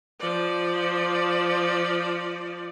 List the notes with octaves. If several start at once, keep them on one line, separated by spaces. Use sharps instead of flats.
F3 D5